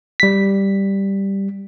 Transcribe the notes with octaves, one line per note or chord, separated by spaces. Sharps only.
G3 B6